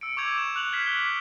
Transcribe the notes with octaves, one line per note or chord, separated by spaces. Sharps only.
E6 C#7 D7
C#6 D6 E6 G6 G#6 F7
C#6 D6 E7
F#6 F7 F#7
F6 G#6 B6 C7
D6 F#6 G7